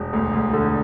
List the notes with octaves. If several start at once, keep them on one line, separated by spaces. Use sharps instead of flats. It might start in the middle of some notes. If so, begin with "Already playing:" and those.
Already playing: E1
D2
D2
D3